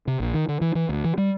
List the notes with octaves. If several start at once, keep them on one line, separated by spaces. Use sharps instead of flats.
C3
A#1
D#3
D3
E3
E3
D2
E3
G3